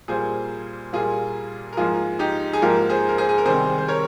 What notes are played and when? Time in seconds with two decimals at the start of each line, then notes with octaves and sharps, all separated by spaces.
0.08 A#2 G3 A#3 G#4 C5
0.93 A#2 G3 A#3 F4 G#4
1.73 A#4
1.77 G#2 F3 A#3 F4 G#4
2.19 D#4 G4
2.53 G#4
2.62 G#2 F3 A#3 G4 A#4
2.89 G#4 C5
3.09 A#4
3.18 G#4 C5
3.29 G#4
3.38 A#4
3.46 C3 D#3 G3 C4 G#4 C5
3.78 C5
3.88 A#4 C#5